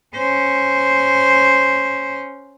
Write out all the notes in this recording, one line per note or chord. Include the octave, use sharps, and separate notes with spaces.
C#4 C5